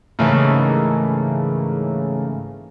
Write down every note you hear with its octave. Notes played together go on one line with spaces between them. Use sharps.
G#2 C#3 E3 A3 A#3